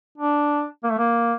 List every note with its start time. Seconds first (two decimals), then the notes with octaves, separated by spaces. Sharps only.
0.18 D4
0.83 A#3
0.91 A3
0.98 A#3